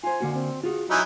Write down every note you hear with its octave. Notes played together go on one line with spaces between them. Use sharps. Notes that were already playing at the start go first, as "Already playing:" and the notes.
F4 C5 G#5
D3 A#3 F#4
C4
F4 F#4 G#4
F#3 D#4 E4 G#5